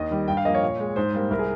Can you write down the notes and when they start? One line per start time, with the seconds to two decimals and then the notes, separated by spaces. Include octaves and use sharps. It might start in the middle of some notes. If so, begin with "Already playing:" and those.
Already playing: D#2 D#5
0.11 D#3 G3
0.28 G2 G5
0.37 F5
0.45 F3 A#3 D#5
0.54 C#5
0.63 A#2
0.79 G#3
0.96 G#2 C5
1.13 G3 A#3
1.30 C2 A#4
1.39 G#4